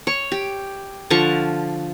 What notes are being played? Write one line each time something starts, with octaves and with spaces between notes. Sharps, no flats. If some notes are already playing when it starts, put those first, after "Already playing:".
C#5 C#6
G4
D3 F3 F5 C#6